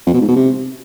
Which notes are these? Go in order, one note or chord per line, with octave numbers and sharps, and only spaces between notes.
F2
B2
G#2
B2
C3